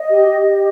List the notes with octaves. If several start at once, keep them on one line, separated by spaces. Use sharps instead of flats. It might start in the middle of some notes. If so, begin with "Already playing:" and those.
Already playing: D#5
G4
G4
D#5